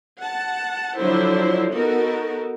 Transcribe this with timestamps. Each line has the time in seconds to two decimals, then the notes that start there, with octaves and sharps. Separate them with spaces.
0.18 F#5 A5
0.98 D3 F3 F#3 D4 E4 C5
1.72 B3 D#4 F#4 A4 A#4